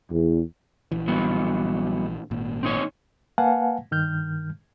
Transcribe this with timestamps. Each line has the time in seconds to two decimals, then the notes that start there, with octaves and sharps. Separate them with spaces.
0.11 E2
0.92 A#1 E3
1.08 F#3 G3 B3
2.31 G#1 A#2
2.63 C4 D#4 C#5
3.38 A#3 B4 F5 F#5 G#5 A5
3.91 G2 D#3 F6 G6